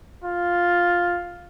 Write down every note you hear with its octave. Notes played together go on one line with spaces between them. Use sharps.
F4